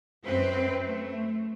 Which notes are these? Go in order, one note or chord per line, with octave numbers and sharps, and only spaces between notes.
F#2 C4 B4
A3